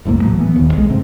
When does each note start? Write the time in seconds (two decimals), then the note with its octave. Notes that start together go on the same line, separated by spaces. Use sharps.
0.05 F#1 C2 A2 A#3
0.21 D#1 A1 F#3
0.38 E3 B3
0.56 D#1 D#2
0.74 B1 G#3
0.89 G2 C3 C4